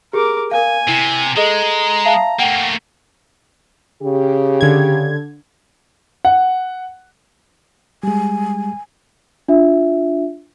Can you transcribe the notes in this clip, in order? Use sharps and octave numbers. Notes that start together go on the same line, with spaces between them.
G4 G#4 A#4 D6
A#4 F5 G#5
C3 E4 D#7
G#3 G#4 A4 D#5 A#5
E5 F5 A5
A3 A#3 F#5 G5 D#7
C#3 G4
D3 G#6
F#5
G3 G#3 G#5
D4 F4 E5